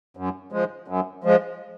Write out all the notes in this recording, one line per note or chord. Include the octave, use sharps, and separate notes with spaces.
F#2
F3 G#3
F#2
F3 G#3